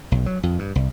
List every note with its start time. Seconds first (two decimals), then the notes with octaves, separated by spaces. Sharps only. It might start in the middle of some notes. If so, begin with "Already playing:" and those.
0.12 B1
0.26 F#3
0.43 F2
0.59 G2
0.75 C2